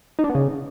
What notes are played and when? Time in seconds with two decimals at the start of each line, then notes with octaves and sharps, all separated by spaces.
0.19 D#4
0.24 D4
0.29 B3
0.35 C#3